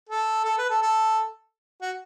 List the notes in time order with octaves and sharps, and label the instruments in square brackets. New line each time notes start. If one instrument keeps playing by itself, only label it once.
[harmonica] A4
A4
B4
A4
A4
F#4